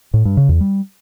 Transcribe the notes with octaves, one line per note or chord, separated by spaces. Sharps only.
A2
G2
C#3
E2
G3